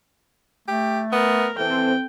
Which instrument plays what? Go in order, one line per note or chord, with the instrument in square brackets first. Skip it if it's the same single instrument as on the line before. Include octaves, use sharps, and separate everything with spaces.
[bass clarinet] A3 [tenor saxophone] G4
[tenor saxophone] B3 [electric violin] A#4
[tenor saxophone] E3 [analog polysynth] C4 A4 [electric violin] G5